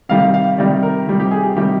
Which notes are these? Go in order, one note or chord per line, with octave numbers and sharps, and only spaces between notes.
C3 D#3 G3 F5
F5
C3 D#3 G3 D5
A#4
C3 D#3 G3
G4
G#4
G4
C3 D#3 G3 G4